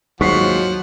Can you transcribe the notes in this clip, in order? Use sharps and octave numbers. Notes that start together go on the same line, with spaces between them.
D#2 G#2 F3 F#3 F#5 C#6 B6 C7